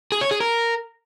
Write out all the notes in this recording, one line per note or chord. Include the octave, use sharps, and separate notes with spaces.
G#4
C#5
G#4
A#4